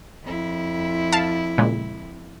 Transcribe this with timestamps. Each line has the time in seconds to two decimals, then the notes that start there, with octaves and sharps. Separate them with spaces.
0.23 F2 E4
1.12 F5 A5
1.58 A#2 C#3 G#3